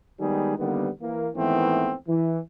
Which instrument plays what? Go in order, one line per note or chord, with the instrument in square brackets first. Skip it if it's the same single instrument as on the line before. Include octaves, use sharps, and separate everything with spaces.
[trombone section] D#3 G3 G#3 B3 D#4 G#4
D3 D#3 G3 A#3 B3
E3 A#3
G#2 D#3 E3 A3 B3 C4
E3